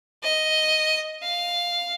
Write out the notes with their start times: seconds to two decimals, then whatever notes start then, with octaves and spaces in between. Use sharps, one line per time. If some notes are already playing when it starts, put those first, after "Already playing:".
0.23 D#5
1.23 F5